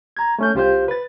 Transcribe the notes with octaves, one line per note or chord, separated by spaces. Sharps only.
A#5 G#6
A3 C#4 G6
C2 F4 G4 C5 F5 G6
B4 A6